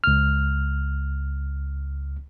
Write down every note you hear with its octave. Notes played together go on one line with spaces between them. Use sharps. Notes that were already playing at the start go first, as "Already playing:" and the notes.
C#2 F6